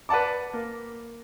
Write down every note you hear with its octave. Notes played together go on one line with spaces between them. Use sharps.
B4 D5 F#5 A5 D6
A#3